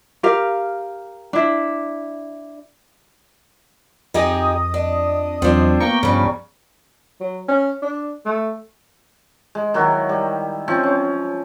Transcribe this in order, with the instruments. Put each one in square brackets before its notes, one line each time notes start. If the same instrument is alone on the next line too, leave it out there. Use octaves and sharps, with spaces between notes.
[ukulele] G4 A#4 F5
D4 E4
[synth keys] F2 D#5 D#6 [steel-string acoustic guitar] D#4 G4 G#4
[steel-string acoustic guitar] D4
[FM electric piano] E2 F#3 [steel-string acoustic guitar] F3 D4 [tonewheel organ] C4
[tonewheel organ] A#3 G5 [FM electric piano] B3 A#5 [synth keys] C#6
[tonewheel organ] G2 F3 [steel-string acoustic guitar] C#3 G3
[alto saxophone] F#3
C#4
D4
A3
[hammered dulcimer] G#3
D#3 F#3 E4 F#4
G3
F3 C4 C#4
C#4